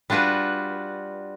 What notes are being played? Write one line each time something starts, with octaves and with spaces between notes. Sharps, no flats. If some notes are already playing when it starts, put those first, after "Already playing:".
G3 D4 F4 F#4 B4